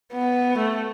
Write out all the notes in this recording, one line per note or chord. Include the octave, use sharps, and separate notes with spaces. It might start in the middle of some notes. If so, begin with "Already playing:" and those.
B3
A3